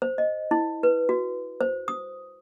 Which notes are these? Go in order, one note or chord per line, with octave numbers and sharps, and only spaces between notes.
C5
D#5
E4
B4
F#4
C5
D#6